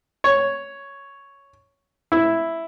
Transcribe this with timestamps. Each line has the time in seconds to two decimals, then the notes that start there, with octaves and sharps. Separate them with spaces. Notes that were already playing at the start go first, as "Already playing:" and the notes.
0.24 C#5
2.12 E4